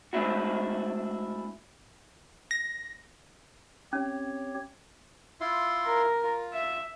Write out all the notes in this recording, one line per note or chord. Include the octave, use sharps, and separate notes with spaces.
G#3 A3 C4 D4 E4 F#4
A#6
C4 C#4 G4 C#5
E4 F4 C6
A#4
F4
E5